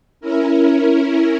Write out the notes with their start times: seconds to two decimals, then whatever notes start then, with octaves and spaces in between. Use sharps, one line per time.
0.21 C#4 E4 A#4